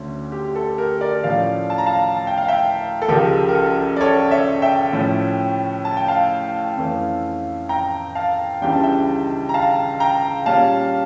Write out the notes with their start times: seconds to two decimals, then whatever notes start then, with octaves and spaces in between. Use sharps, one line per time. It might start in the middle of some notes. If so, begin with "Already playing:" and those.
Already playing: D2 D3 A3 C#4
0.32 G4
0.55 A4
0.78 G4 A#4
1.01 A#4 D5
1.24 A2 F3 A3 C#4 D5 F5
1.70 A5
1.78 A#5
1.86 F5 A5
2.16 A5
2.27 G5
2.38 F5
2.48 E5 G5
3.02 A4
3.08 C#2 C#3 F3 G4 A#4
3.49 A#4
3.54 A4
3.96 D5
4.01 A4 C#5
4.31 C#5 E5
4.62 E5 G5
4.93 A2 F3 C#4
5.85 A5
5.97 G5
6.08 F5 A5
6.77 F2 E3 A3 C#4
7.69 G5 A#5
8.15 F5 A5
8.62 C#2 C#3 E3 G3 D4 G5
8.72 A5
8.83 E5 G5
9.49 A#5
9.54 F5 A5
10.00 G5 A#5
10.46 A#2 G3 C#4 F5 A5